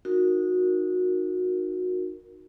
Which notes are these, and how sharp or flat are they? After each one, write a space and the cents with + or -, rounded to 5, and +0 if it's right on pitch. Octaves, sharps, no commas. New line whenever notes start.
D#4 -10 F#4 -25 A#4 +0